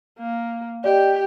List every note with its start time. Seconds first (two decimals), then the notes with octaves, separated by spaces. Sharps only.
0.18 A#3
0.84 G4 D5 D#5